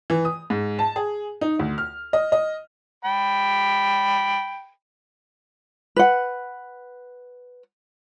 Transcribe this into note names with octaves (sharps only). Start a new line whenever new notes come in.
E3
D#6
G#2
A5
G#4
D#4
D2
F6
D#5
D#5
G5 B5
B4 F#5